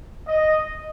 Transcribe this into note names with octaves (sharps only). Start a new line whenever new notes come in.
D#5